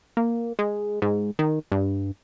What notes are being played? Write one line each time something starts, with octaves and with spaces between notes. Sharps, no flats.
A#3
G#3
G#2
D#3
G2